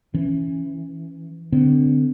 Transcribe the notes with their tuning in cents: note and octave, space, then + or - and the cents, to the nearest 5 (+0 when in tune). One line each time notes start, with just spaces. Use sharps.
E3 +0 C#4 +0
D3 +0 C4 -35